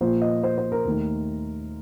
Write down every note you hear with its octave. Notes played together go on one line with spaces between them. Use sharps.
A#2 F3 A#3 C5
D#5
C5
C5
A#4
D#2 D#3 A3